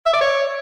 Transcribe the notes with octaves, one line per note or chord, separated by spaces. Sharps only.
E5
D5
C#5